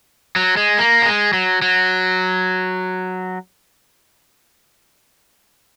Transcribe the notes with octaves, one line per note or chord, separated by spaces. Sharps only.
F#3
G#3
A#3
F#3
G#3
F#3
F#3